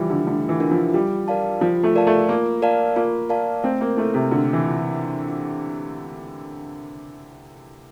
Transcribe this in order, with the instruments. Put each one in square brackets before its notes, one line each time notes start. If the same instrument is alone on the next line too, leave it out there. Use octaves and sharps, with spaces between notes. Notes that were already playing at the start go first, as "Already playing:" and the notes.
Already playing: [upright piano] E3 F3 G3
D3
[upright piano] D3 [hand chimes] A3
[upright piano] E3
[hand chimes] D4 F4 A#4 E5
[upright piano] F3
[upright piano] G3 [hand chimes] F4
[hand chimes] A#4 D5 F5 A5
[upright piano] F3 [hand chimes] F4
[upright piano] A3
[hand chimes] A#4 D5 F5 A5
[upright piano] A3
[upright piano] A#3 [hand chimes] F4
[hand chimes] A#4 D5 F5 A5
[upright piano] A#3 [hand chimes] F4
[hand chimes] A#4 D5 F5 A5
[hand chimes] A3 [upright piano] C4
[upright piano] A#3
[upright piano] A3 [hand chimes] E4 A4
[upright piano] C3
[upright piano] D3 [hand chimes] A3
[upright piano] E3